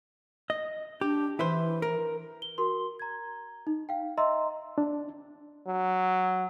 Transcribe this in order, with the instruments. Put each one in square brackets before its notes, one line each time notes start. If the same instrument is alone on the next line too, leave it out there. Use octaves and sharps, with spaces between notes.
[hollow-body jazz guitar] D#5
[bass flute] D4 [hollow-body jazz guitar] G4
[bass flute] E3 [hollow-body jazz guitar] E4 B4 C5
[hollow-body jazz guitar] A#4
[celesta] G7
F#4 A#4 C6
A#5 G#6
D#4
F5 G5
D#5 E5 A#5 C6 E6
[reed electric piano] D4
[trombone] F#3